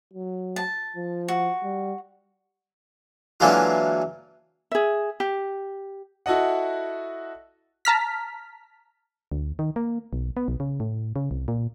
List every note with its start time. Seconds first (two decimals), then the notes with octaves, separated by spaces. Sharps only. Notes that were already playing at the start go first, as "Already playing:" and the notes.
0.14 F#3
0.56 A5
0.96 F3
1.28 F#4
1.64 G3
3.40 D3 E3 F#3 G#3 A#3 F4
4.71 G#4 E5
5.20 G4
6.26 E4 F#4 A4 D#5 F#5
7.85 A5 A#5 F6 B6
9.32 D2
9.59 D#3
9.76 A#3
10.13 B1
10.37 B3
10.48 B1
10.60 C#3
10.80 A2
11.16 C#3
11.31 C2
11.48 A#2